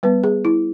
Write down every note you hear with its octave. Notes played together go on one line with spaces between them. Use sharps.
G3 B3 B4
G#4
E4